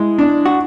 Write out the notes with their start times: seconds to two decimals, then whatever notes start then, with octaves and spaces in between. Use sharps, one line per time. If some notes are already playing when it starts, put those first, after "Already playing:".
Already playing: G#3 E4
0.18 D4
0.46 F#4